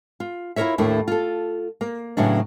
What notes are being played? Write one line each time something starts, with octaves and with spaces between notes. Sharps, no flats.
F4
E4 F4 A4 A#4 C#5 E5
D#2 A2 A3 A#3 D4 E4
F4 A4
A#3
E2 A2 C#3 F#3 D4